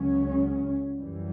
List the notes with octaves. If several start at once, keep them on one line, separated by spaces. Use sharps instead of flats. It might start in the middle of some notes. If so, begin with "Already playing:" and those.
Already playing: C#2 C#3 F#3 C#4
F#2 E3 G3